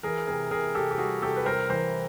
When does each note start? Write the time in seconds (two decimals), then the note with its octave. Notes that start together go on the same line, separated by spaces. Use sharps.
0.03 E3 G#4 A#4
0.27 C3 G#4 A#4
0.51 C3 G#4 A#4
0.75 C3 G4 A4
0.91 G4
0.98 G3 F#4 G#4
1.22 C3 G4 A4
1.37 B4
1.46 C2 A#4 C5
1.70 E3 A#4 C5